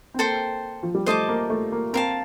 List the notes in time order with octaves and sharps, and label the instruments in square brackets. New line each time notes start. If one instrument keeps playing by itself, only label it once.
[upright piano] C4
[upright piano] A#3 [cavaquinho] A4 C5 G5
[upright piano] F3
G3
[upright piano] A3 [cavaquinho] C5 D#5 A5 D6
[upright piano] A#3
A3
A#3
[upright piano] C4 [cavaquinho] A#4 F5 A5